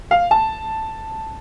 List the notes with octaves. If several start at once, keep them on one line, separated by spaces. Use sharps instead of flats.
F5
A5